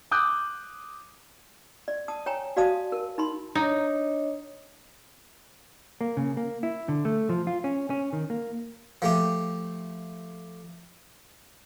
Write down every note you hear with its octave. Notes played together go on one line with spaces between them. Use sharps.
D6 D#6 F#6 G6
D5
A5 D#6
C#5 G5 G#5 A#5
F#4 D5 F5 A5 D#6
A#4
D#4 B5 C6
D4 D#4 C#5 D#5
A#3
C#3
A#3
E4
D3
A3
F3
F4
C#4
C#4
D#3
A#3
F3 A3 G4